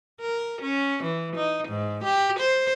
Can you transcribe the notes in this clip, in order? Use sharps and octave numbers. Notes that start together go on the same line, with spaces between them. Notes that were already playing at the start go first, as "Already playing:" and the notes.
A#4
C#4
E3
D#4
G#2
G4
C5